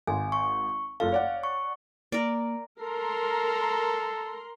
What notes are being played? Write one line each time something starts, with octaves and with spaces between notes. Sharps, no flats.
G#1 G#2 G#5
C#6
F#1 F4 A4 F5
C#5 D5 F#5
C#6
A#3 A#4 D5
A4 A#4 A#5 C6